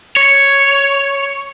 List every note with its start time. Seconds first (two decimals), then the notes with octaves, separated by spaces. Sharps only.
0.16 C#5